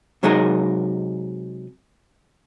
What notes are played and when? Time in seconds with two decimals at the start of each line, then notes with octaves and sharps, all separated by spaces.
0.23 C3 F#3 G#3 D#4 G#4 A#4